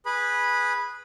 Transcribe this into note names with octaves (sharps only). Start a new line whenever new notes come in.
G#4 B4 B5